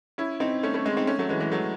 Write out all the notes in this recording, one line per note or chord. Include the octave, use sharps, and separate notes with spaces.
C#4 E4
C4 D#4
A3 C#4
A3 C#4
G#3 C4
C4 D#4
A3 C#4
F#3 A3
E3 G#3
E3 G#3
F#3 A3